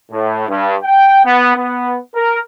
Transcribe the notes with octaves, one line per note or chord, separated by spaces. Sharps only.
A2
G2
G5
B3
B3
A#4